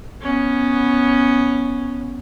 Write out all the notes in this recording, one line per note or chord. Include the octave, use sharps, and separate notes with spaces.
B3 C#4